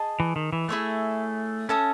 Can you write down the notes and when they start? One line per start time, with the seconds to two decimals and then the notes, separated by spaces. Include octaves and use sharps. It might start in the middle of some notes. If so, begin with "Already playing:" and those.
Already playing: G#4 D#5 A5
0.20 E3
0.36 D#3
0.53 E3
0.69 A3 E4 G#4 C#5 E5
1.69 C#4 A4 E5 A5 D#6